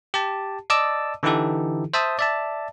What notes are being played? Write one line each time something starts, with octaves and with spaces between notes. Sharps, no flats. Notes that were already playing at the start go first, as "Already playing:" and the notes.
G4 A5
D5 D#5 A5 D6 E6
D3 E3 D#4 E4 G4 A4
C5 E5 A5 D#6
D5 E5 A5